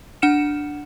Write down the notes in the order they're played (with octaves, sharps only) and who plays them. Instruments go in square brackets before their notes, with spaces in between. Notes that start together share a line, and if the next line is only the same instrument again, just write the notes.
[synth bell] D4 F#5 F6 C#7 E7